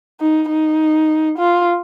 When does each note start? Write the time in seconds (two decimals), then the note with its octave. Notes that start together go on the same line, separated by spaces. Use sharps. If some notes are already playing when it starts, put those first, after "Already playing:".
0.20 D#4
0.50 D#4
1.39 F4